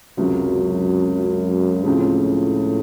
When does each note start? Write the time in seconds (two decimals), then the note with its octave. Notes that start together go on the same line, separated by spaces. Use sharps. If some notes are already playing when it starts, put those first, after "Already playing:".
0.18 C#2 F#2 C3 F#3
1.85 C#2 A2 C#3 F3 C4